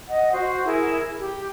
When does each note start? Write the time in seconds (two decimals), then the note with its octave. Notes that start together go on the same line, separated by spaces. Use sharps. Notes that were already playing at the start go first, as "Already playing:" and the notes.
0.08 D#5 F#5
0.32 F#4 C5
0.64 E4 G#4 A#4
1.20 G4